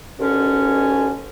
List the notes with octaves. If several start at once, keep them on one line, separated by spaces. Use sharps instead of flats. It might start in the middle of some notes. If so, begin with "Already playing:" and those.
D#2 B2 D3 C#4